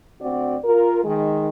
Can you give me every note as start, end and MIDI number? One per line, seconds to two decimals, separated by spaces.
0.20 0.56 38
0.20 0.56 60
0.20 0.56 66
0.20 0.56 74
0.63 1.02 65
0.63 1.02 70
1.03 1.47 51
1.03 1.47 56